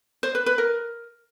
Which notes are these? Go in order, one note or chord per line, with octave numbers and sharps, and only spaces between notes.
C5
B4
B4
A#4